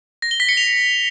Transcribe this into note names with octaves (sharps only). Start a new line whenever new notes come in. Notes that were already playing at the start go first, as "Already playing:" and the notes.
A#6
G7
B6
C#7
F7